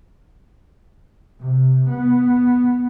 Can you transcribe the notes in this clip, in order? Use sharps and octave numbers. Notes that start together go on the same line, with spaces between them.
C3
B3